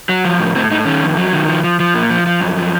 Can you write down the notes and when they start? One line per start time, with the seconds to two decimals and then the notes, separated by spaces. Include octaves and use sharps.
0.09 F#3
0.25 F3
0.39 A2
0.55 A2 C4
0.71 A2 D#4
0.86 D#3 C#4
1.02 F2
1.17 F#3
1.33 D#3
1.48 F3
1.64 F3
1.80 F3
1.94 A#2
2.10 F3
2.26 F3
2.41 F#2
2.57 F3